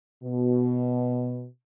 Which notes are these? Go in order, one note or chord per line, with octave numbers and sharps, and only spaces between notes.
B2